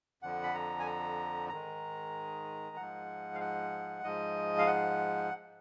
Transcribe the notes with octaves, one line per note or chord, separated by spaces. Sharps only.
F2 D3 F3 F#5
B5
A#5
G#5
A#5
G#2 D#3 G#3 A#5
G#2 F3 G#3 F#5
F5
F#5
G#2 F3 G#3 D#5
F5
F#5